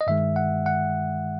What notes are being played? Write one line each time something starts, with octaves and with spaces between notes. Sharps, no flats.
D#5
G2 D#3 G#3 E5
F#5
F#5